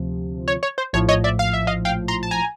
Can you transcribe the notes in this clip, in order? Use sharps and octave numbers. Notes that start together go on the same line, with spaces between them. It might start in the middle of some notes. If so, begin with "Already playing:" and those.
Already playing: D2 C3 F3
C#5
C#5
C5
A#1 A2 F3 C#5
C#5 D#5
D5 E5
F5
E5
D#5 F5
F5 G5
A#5 C6
A5
G#5 A#5